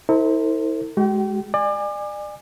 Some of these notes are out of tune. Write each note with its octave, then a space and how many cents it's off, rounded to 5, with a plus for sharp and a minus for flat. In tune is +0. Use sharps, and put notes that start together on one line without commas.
E4 -40 A4 +45 C5 +0
G#3 +10 F#4 +45 G5 -30
D5 +35 G#5 -20